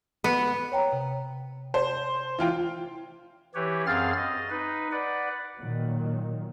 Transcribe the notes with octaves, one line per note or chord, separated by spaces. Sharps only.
B3
C#5 G5 A#5
C3
C5
E3 F4 G5
E3 G4 B4 C#5
F#2 C4 G#4 F5 F6 A6
D#5
D#4 B4
B4 D5 F#5
A#2 D#3 F#3